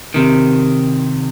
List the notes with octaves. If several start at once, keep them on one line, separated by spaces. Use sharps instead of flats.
C3 D#3